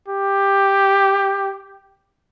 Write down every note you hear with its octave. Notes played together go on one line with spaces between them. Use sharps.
G4